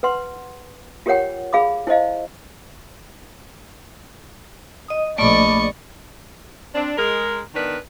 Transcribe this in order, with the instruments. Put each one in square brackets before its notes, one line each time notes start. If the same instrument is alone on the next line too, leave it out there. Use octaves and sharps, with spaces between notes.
[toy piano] B4 F#5 C6
F4 G4 A#4 C#5 F#5 G5
G#4 F5 B5 D6
E4 C5 D#5 F5
[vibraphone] D#5 D#6
[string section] A#1 D5 [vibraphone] A3 B5 [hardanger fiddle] D#5 C#6
[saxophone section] C4 D4
G#3 A#4
D#3 B3 D4 A#4 B4